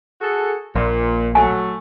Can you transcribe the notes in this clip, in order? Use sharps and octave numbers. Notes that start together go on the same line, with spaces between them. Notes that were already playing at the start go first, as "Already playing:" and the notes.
F#4 G#4 A4
A#1 A#2
F#3 A3 G#5